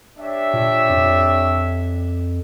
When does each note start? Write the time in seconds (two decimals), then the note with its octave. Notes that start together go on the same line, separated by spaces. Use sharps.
0.17 D4 G4 C#5 E5
0.54 A#2
0.90 F2